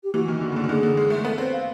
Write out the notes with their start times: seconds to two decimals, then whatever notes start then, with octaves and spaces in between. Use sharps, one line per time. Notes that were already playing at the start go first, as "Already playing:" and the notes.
0.04 G4
0.14 E3 F#4
0.28 D#3
0.41 D3 F#4
0.52 C#3
0.56 D3
0.64 D#3
0.69 D3 G#4
0.83 D3
0.97 G#3
1.10 A3
1.24 B3 A4
1.38 C4 B4
1.52 F5